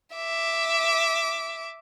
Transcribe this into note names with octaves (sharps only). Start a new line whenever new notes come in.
E5 D6